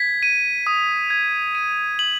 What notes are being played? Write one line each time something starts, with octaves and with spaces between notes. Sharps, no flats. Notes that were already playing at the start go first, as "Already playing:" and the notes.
Already playing: G#6 B6
D#7
D#6
G#6
D#7
F#7